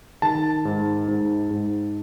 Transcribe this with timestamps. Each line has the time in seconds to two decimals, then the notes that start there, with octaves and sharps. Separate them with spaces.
0.22 D#3 A5
0.65 G#2
1.08 G#2
1.51 G#2